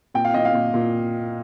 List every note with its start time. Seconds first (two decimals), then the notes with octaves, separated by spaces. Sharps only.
0.14 A#2 G5
0.25 F5
0.34 A#2 D#5
0.45 F5
0.54 A#2
0.74 A#2